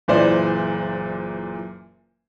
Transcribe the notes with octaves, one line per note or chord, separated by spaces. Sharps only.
F#1 A#2 E3 C5 D5